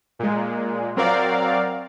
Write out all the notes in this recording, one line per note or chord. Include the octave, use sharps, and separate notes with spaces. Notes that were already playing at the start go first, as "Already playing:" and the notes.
A#2 G#3
F#3 C4 A#4 D5 F5